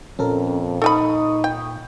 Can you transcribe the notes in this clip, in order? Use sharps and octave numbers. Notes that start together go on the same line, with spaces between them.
F2 A#2 C#4 A4 A#4
D#4 A4 G5 B5 C#6 D#6
G5